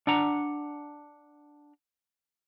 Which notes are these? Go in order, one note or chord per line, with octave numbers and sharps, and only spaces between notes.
D4 F#5 A#5